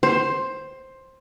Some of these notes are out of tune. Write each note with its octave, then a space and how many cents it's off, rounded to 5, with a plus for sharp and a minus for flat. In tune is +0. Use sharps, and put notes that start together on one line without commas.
C5 +10